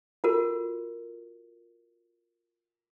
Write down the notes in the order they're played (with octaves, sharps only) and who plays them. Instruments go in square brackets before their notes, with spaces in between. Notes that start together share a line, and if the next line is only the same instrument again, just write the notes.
[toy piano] F4 F#4 A4 A#4